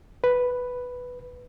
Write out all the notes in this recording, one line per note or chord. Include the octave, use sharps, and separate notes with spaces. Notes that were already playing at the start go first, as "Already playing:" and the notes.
B4